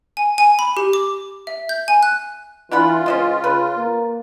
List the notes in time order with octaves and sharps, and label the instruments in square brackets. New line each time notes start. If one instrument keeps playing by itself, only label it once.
[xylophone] G#5
G#5
B5
G4
D6
E5
G6
G#5
F#6
[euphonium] E3 [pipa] D4 F#5 B5 [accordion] F4
[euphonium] C#2 [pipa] C#4 C5 D#5
[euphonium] C#3 [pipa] B4
[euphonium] A#3